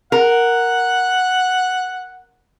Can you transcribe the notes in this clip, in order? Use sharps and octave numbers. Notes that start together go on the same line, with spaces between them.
A#4 F#5